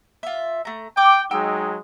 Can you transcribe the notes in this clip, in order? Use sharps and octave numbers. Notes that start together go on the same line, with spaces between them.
F4 E5
A3 A#5
G5 D6
F#3 G#3 D#4 G5 E6 F6